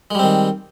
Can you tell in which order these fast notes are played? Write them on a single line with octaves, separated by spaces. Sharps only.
G#3 G3 C4 D#3